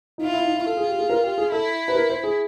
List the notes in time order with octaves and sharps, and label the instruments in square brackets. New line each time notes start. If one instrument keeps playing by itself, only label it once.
[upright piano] D#4
[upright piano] E4 [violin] F4
[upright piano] E4
D#4
E4
[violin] F4 [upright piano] A4
[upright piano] G#4
G4
G#4
A#4
G4
G#4
[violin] E4 [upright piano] A4
[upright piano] B4
A#4
C5
G#4